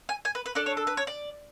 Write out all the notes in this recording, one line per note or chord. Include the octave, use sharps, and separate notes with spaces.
G#5
G#5
B4
B4
D4 A4 D5
C#5
A4
B4
C#5
D5